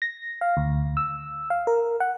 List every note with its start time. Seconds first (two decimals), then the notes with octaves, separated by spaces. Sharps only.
0.02 A#6
0.41 F5
0.57 D2
0.97 E6
1.50 F5
1.67 A#4
2.00 F#5